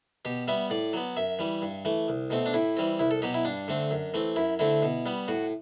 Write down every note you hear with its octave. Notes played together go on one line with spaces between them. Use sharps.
B2 G4
G3 B3 E5
A2 D5
F#3 B3
F#2 E5
E3 G3
G2
E3 A3
C2
B2 A3 C4
D4
A2 E4
E3 G3 C4
C2 E4
A4
B2 F#3 G4
E4
G2 D4
D3 A3 C4
F#2
E3 A3 C4
F#2 E4
D3 A3 C4 E4
B2
G3 B3
A2 F#4